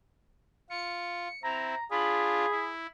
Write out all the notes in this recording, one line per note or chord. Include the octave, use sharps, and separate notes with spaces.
F4 C#7
C4 E4 A#5
D4 F4 G#4 B5
E4